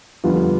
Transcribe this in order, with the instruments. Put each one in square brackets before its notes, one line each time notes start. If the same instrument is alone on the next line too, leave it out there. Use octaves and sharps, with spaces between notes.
[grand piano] F2 D3 G3 B3 F4